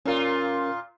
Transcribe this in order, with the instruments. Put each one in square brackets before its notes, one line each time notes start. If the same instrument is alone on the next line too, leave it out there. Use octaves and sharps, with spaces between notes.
[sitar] A#2 F4 [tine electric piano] C#4 A#4